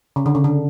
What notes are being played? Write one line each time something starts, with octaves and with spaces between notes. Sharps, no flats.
C#3
D3
C#3
D3